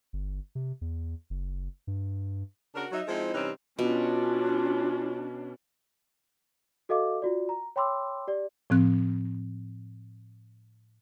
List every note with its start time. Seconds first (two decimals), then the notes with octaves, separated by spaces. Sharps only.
0.13 G1
0.55 C3
0.81 E2
1.30 F#1
1.87 G2
2.75 C#3 D4 F#4 A#4
2.92 F#3 D#4 E5
3.08 F3 G#3 C4 D#4 E4
3.34 C3 E3 G3 C4 C#4 D#4
3.79 B2 C#4 D4 F4
6.89 F#4 A4 D#5 F5 D6
7.22 F4 F#4 D5
7.49 A#5
7.76 C#5 G5 B5 C6 D6 E6
8.28 G4 D5
8.70 A2 F3 C4 F#6